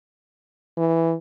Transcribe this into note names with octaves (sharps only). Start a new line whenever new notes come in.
E3